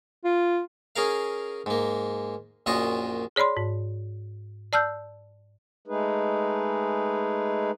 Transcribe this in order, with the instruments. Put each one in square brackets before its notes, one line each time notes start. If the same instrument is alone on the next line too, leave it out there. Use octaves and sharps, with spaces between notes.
[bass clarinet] F4
[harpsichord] C#4 G#4 A#4 F5
G#2 A#3
A#1 F#2 A#2 F4 D#5 C#6
[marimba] G#4 C#5 D5 B5 C6
G#2
D5 A5 E6 F6 G6
[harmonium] G#3 A3 D#4 G#4 B4